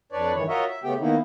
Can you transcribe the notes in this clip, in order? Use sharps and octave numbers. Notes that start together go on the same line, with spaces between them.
F2 D4 B4 C#5 D5
G2 D#3 E3 C#5
F4 F#4 A#4 C#5 D#5 E5
E5
C#3 A3 B3 G4 G5
D#3 A#3 B3 D#4 E4